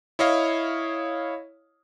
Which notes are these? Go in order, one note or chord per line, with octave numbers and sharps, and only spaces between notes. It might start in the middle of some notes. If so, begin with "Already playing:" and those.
E4 C#5 D#5 F5